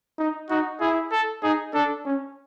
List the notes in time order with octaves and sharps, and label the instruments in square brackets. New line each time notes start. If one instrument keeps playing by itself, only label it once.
[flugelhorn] D#4
[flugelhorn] D#4 [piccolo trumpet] F#4
[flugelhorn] E4 [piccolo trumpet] G#4
[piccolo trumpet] A4
[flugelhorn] D#4 [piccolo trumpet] G#4
[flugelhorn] D4 [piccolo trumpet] A4
[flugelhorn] C#4